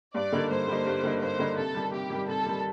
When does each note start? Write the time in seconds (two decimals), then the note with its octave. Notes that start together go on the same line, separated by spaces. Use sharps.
0.14 G2 D5
0.32 D3 G3 A#3 D#4
0.50 G2 C5
0.68 D3 G3 A#3 D#4
0.86 G2
1.03 D3 G3 A#3 D#4
1.21 G2 C5
1.39 D3 G3 A#3 D#4
1.57 C3 A4
1.74 D#3 G3
1.93 C3 G4
2.10 D#3
2.15 G3
2.28 C3 A4
2.46 D#3 G3